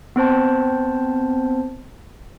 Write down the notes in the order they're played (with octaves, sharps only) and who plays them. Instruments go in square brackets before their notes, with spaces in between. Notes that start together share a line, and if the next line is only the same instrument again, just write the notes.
[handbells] B3 C4 C5 A5